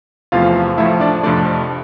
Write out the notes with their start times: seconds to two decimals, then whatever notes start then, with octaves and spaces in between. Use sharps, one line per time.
0.32 E2 C3 F3 A3 F4 F5
0.77 A2 F3 A3 E4 E5
1.00 D4 D5
1.23 F2 C3 F3 A3 D4 D5